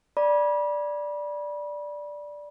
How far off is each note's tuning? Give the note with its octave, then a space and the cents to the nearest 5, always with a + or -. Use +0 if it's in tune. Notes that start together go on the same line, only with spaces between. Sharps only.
D5 +0 B5 -35